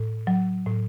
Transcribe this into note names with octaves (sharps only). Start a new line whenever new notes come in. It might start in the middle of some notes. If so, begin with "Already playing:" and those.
Already playing: A2
F#3
A2